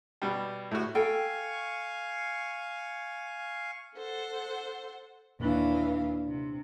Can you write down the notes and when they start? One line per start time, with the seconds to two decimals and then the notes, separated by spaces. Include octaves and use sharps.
0.22 B2 G3
0.71 A2 F#4
0.95 A4 F5 G5 G#5 C#6
3.94 A4 C5 F#5
5.40 D#2 A#2 E3 D4 F5
6.29 C3